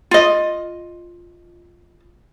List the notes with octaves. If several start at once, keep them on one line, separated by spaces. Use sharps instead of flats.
F4 D#5